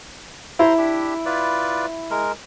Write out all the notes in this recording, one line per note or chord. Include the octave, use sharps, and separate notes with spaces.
E4 C5 A#5 C6
D4 G4
F4 B4 D5
G#3 A#4